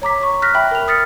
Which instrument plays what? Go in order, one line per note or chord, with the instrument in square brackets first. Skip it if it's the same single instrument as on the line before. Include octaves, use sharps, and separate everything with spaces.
[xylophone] C#5 A#5 D6 B6
C#6
F6 F#6 A#6 B6
E5 G5 B5
A#4 F7
D#6 F6 A6 B6 C#7